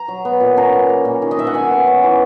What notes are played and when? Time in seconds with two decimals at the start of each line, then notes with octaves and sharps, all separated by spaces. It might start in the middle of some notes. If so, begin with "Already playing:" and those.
Already playing: A#5
0.08 F#3
0.25 B3
0.40 A#2
0.57 C#4 A#5
0.74 C#4
0.89 A#3
1.05 A#2
1.22 D#3
1.31 D#5
1.38 D#3 E5
1.47 F#5
1.54 D#3 G#5
1.71 B3
1.87 C#4
2.03 E3